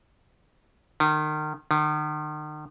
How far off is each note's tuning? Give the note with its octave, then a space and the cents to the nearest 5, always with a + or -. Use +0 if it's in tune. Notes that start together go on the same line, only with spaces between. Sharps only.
D#3 -30
D#3 -40